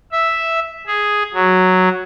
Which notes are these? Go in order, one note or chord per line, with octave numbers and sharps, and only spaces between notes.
E5
G#4
F#3